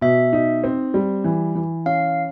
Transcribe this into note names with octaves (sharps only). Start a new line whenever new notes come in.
B2 E5
D#4
C4
G3
E3
E3
C#4 F5